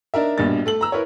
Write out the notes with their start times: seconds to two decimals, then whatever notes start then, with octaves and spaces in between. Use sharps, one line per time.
0.14 D4 D#4 A#4 E5
0.38 A#1 G2 B2 D4 A6
0.66 A3 A4 F#7
0.81 A#5 E6
0.92 E4 A#4 B4 C#5